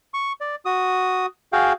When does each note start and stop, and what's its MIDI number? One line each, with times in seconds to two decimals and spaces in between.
0.14 0.32 85
0.41 0.55 74
0.65 1.26 66
0.65 1.26 87
1.53 1.73 66
1.53 1.73 68
1.53 1.73 77
1.53 1.73 79